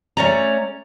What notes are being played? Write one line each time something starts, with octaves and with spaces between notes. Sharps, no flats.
A3 C#4 C#5 D5 A#5